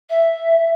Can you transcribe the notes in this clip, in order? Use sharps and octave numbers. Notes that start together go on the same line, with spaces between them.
E5